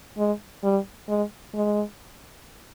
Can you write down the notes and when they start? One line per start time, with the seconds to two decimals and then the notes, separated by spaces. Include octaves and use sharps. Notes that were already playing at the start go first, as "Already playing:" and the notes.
0.18 G#3
0.64 G3
1.09 G#3
1.54 G#3